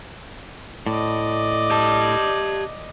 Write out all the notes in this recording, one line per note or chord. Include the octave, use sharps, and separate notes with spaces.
A2 D5 D#5
G4 A5